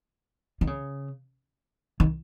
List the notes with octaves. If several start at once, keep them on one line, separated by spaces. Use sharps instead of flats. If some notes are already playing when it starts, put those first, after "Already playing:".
D#3
C#3
D#3